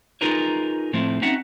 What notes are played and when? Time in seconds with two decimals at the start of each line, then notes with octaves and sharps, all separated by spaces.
0.21 D#4 F4 G#4 A#4 B4 C#5
0.93 A2 F3 A3 C4 E4
1.22 C4 C#4 D#4 F#4 E5 F#5